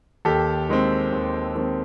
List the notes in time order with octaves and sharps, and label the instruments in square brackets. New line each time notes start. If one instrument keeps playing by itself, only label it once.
[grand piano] D#2 G4 A4
D#3 G#3 C4
D#2
D#3 G#3 C4